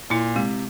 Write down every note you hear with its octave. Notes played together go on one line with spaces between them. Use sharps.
A#2 E4
C3 G#3